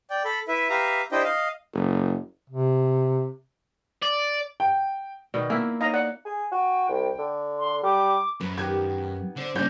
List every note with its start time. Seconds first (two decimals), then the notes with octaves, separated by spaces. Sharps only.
0.10 D5 G5
0.25 A4 B5
0.48 E4 B4 E5
0.70 G4 B4 E5 F5 A#5
1.12 D4 E4 G4 C5 D#5 G5
1.23 D#5 F5
1.74 F#1
2.50 C3
4.03 D5
4.60 G5
5.34 B2 D#3 D5
5.50 A#3 B3 E4 E5
5.81 D#4 C#5 D#5 F5 A#5
5.94 D5 F#5
6.25 G#4
6.52 F#4 G5
6.89 C2
7.18 D3
7.59 C6
7.83 G3 D6
8.41 F#2 B4
8.58 D#3 B3 G4 G#6
9.37 D3 D4 C5
9.55 G2 C#3 A#3 D4 C#5 D5 G6